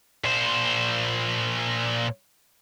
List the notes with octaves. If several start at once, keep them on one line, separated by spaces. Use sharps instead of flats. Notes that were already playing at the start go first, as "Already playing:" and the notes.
A#2 C5